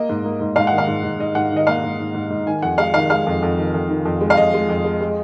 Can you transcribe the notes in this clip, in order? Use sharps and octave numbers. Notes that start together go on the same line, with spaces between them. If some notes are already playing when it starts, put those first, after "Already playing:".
Already playing: A#3 D#5
G#2
A#3
G#2
G#2 F5
D#3 F#5
F5
G#2
G#2
G#2 D#5
G#2 F#5
D#3 D#5
A#3 F5
G#2
G#2
G#2
G#2
D#3 G#5
F2 F#5
G#3 F5
D#3 F5
G#3 F5
F2
F2
D#3
F2
D#3
F2
G#3
F5
F2 D#5
G#3
F2
G#3
G#3